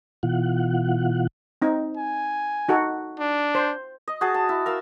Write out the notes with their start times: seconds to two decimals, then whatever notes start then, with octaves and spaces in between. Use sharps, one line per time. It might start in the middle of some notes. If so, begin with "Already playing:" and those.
0.23 B2 E3 F4 F#5
1.62 C4 D#4
1.97 G#5
2.69 D#4 F#4 A4
3.20 D4
3.55 C5
4.08 D#5
4.21 F#4 G#4 A5
4.34 A5
4.49 E4
4.66 A#4 F5 E6